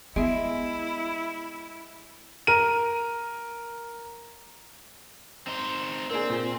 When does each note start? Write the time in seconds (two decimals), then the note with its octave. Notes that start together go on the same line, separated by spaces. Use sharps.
0.16 G#3 B3 E4 E5 D7
2.47 A#4 D#7
5.47 C4 D#4 C5
6.11 A#3 C4 D4 G#4
6.30 A#2